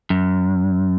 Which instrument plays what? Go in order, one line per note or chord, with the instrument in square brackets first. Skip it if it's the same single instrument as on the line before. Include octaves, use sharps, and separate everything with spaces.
[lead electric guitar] F#2